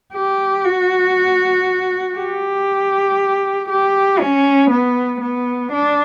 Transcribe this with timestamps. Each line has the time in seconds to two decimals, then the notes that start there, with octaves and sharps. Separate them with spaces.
0.14 G4
0.64 F#4
2.17 G4
3.69 G4
4.19 C#4
4.70 B3
5.21 B3
5.72 D4